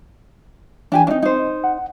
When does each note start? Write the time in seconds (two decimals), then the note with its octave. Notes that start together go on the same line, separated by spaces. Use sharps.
0.92 E3 D4 G4 G#5
1.07 C4 D4 D#4 D#5
1.22 D#4 C5
1.64 F#5